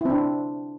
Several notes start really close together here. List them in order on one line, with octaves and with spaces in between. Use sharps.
E4 C4 D4